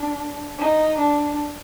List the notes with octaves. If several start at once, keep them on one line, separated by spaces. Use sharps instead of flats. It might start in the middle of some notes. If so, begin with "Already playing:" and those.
Already playing: D4
D#4
D4